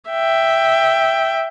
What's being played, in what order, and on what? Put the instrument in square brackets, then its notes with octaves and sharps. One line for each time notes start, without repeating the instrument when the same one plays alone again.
[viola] E5 G5